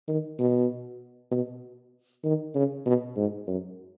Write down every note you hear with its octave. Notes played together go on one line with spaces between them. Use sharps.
D#3
B2
B2
D#3
C#3
B2
G#2
F#2